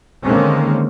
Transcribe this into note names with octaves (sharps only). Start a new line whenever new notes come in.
D3 D#3 G#3 A#3 C4 C#4